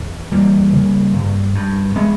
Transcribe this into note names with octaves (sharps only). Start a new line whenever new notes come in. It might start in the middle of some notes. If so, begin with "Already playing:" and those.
Already playing: E2
E2 G3 A#3
C#3
G2
G2
G#3 B3